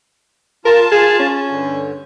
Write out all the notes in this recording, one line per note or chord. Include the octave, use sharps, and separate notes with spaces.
F4 A#4 A5
G#4
C#4
G2 D3